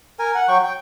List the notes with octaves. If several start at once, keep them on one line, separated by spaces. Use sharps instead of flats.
A#4 G#5
F#5
F#3 G5 C#6
G5